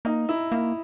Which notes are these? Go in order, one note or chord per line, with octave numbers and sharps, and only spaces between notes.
A#3 D#4
E4
A#3 E4